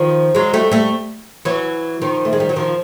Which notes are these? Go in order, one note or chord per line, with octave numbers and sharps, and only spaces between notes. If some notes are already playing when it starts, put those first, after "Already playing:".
Already playing: D#3 F3
F#3 G#3
G3 A3
G3 A3
E3 F#3
D#3 F3
A3
G#3
G3
F#3
D#3 F3